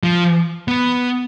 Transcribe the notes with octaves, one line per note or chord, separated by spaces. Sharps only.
F3
B3